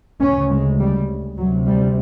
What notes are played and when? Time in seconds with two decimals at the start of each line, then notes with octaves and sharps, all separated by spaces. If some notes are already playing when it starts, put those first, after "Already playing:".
0.21 D2 C#3 C#4
0.51 G#3
0.80 G3
1.37 D2 F#3
1.42 C3
1.66 G3